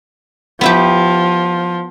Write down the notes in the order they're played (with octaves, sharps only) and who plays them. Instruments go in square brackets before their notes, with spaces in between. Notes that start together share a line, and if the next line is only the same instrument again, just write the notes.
[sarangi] F3 [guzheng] B3 E4 G4